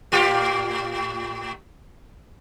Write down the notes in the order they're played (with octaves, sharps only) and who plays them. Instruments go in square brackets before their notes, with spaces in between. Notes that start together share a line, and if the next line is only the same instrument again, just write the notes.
[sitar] A2 F4 G4